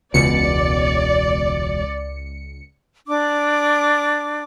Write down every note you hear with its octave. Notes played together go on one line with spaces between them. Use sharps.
E1 C#2 B2 D5 C#7
D4 D6